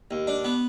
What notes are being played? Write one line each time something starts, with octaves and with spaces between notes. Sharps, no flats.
D#2
D4
B3